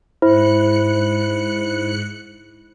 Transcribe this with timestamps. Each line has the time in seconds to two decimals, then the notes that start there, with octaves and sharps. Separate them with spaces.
0.22 G#2 E4 C5 F#6 C#7